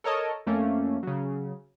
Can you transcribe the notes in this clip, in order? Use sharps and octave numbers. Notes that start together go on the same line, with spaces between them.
A4 A#4 C#5 D#5 A5
F2 A3 A#3 C#4
C#3 F#3